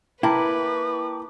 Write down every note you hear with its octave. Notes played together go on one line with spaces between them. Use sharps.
A#3 E4 B4 G5 A5 A#5 D6